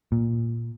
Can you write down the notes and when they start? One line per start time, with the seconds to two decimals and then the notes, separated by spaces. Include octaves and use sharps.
0.12 A#2